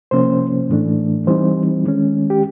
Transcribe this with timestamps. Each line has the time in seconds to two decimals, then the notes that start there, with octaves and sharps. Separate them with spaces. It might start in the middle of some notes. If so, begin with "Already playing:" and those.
0.11 C3 F3 A#3 C#4 C5
0.69 A2 E3 A3 D4
1.27 E3 G3 C4 D#4 C5
1.84 D#3 G#3 C#4
2.30 G4